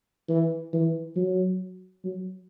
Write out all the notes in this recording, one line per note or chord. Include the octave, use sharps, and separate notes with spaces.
E3
E3
F#3
F#3